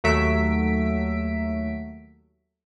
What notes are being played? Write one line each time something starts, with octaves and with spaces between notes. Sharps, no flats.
D#2 F#3 A3 E5 B6 D7